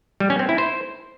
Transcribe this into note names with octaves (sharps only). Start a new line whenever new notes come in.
G3
C#4
C4
E4
C5